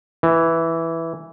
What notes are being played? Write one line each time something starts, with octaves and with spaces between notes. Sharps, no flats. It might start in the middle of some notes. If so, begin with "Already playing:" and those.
E3